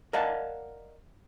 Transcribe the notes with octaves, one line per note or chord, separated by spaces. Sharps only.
A#4 D5 D#5 F5 F#5 A5